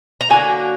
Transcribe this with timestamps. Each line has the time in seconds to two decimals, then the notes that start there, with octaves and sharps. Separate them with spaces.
0.21 A#5
0.29 D3 F#3 A#3 G#5